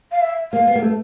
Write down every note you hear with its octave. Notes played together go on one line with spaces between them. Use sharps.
F5
E5
A#3 F5
B3
A#3
A3